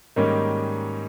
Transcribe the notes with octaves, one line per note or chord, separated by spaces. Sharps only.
G#2 D#3 G3 A#3 C#4